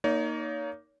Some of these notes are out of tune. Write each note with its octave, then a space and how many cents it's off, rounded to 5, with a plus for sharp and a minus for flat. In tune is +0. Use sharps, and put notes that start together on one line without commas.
A#3 +0 D#4 +0 C#5 +35